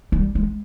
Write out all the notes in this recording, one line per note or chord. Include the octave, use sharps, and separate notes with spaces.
G3
G#3